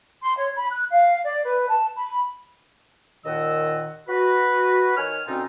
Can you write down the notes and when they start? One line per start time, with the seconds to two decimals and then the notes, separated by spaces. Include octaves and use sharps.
0.22 C6
0.38 C#5
0.55 B5
0.71 F#6
0.91 F5
1.24 D5
1.45 B4
1.69 A5
1.96 B5
3.25 D#2 A#2 D#3 D#5 F#5 E6
4.08 F#4 B4
4.97 D#3 C#5 G#5 F6
5.27 D2 B2 C4 C#4 D#4 F4